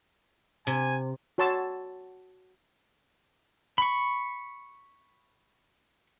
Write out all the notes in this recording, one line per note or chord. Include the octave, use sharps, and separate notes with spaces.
C3 G#5
F#4 C#5 A5 C6 E6
B5 C#6